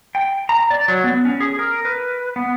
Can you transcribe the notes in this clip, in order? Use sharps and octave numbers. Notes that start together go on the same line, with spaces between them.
G5
A#5
D5
F#3
B3
C#4
G#4
A#4
B4
B3